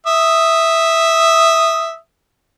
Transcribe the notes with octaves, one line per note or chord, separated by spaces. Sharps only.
E5 D#6